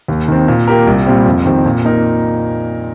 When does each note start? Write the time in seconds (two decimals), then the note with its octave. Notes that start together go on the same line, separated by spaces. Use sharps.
0.08 D#2
0.28 D#3 C4
0.48 A#2
0.68 A#3 G4 A#4
0.87 C2
1.06 A#2 G3 C4
1.26 F2
1.45 D#3 C4 G4
1.65 A#2
1.84 A#3 D#4 A#4